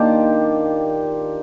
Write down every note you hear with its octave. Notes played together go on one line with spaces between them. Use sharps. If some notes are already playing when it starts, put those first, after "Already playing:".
Already playing: D#3 A#3 D4 F4 G4